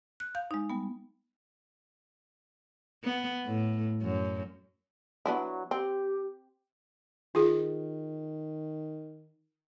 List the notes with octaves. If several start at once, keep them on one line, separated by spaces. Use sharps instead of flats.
F#6
F5 G6
G#3 D#4
G3 B3
B3
A2
F#2
F#3 B3 D4 E4
C4 G4
D#3 F4 G#4